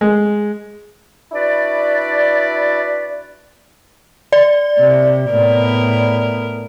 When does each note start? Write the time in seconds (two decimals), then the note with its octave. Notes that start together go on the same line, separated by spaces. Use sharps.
0.01 G#3
1.32 D4 E4 F#4 B4 D5
4.33 D5
4.79 C3
5.30 A2 B3 A#4